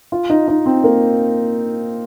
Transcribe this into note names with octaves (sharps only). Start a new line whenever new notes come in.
F4
D#4
D#4
C4
A#3